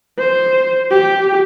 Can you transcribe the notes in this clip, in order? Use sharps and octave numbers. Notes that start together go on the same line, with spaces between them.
C5
G4